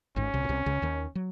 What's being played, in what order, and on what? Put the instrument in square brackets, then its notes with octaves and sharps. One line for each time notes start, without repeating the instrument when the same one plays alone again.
[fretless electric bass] G#1 G#2 [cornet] C#4
[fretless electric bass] C2 C3
A#2
C2 C3
C#2 C#3
D#2 D#3
F#3